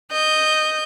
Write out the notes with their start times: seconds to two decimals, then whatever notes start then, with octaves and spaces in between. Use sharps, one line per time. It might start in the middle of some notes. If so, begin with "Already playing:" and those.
0.11 D#5 G6